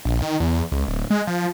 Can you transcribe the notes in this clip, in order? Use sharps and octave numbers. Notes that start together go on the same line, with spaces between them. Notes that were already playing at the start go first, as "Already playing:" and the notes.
A#1
D#3
E2
C#2
D1
G#3
F3